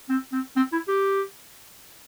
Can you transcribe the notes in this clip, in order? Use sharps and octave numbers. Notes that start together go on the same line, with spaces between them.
C4
C4
C4
E4
G4